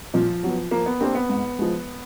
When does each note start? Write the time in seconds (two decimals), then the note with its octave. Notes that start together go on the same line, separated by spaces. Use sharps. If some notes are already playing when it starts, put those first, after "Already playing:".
0.14 A#2 F3
0.43 F#3 B3
0.71 F3 A#3
0.86 B3
1.01 A#3 C4 D4 G4 C5
1.15 B3
1.29 G#2
1.59 F3 G#3